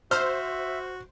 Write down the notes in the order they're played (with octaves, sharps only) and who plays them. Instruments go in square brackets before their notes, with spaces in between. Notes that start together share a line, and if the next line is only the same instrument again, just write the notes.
[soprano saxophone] F#4 [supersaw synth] C5 [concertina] E5 [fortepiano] E6 F6